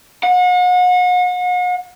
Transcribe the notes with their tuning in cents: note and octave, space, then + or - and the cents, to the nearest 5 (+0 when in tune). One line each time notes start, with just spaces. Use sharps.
F#5 -40